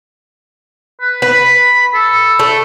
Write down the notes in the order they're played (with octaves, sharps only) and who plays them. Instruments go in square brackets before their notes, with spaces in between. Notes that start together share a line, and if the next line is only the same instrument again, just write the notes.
[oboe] B4
[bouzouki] B4 [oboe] B5
[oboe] A4
[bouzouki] A3